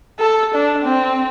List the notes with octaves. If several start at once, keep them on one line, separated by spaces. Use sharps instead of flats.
A4
D4
C4